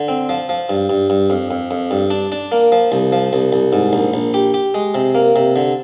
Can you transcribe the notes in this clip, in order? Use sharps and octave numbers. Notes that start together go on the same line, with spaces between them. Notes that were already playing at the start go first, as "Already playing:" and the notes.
Already playing: D3
C4
F3
F3
G2
G2
G2
F2
F2
F2
G2
D4
D4
A#3
F3
C2
F3
C2
C2
G#2
A#1
A#1
G4
G4
G#3
C3
A#3
C3
D3